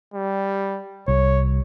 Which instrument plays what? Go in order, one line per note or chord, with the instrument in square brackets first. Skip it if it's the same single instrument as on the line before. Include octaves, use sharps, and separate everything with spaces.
[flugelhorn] G3
[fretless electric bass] C2 [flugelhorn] C#5